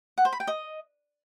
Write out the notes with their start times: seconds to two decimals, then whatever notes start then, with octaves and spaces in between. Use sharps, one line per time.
0.18 F#5
0.25 C5
0.32 B5
0.40 G5
0.47 D#5